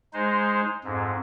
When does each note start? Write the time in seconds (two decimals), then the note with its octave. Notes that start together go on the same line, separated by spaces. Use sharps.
0.13 G#3 D#4 C5
0.84 F2 G#2